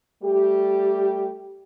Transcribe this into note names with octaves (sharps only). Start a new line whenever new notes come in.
G3 A3 G4